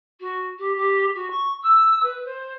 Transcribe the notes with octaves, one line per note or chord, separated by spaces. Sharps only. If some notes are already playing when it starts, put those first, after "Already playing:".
F#4
G4
G4
F#4
C#6
E6
B4
C5